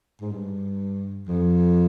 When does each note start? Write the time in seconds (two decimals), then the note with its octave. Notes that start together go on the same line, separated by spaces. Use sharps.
0.21 G#2
0.31 G2
1.28 F2